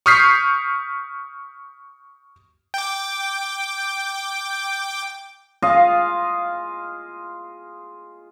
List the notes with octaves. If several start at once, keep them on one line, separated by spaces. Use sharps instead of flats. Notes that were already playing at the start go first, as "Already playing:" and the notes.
C#6 D#6 F6 G6 B6 C7
G5 D6
F4 G#4 D#5 F5